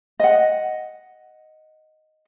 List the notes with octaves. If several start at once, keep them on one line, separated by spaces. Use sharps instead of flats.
D#5 F#5